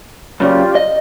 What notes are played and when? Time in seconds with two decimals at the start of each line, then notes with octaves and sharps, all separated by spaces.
0.40 F#2 C#3 F4 G4 D5
0.75 D#5